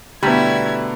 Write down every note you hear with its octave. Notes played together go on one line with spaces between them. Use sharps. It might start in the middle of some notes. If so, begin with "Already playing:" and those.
B2 D3 G3 A3 E4 A#5 B5 G#6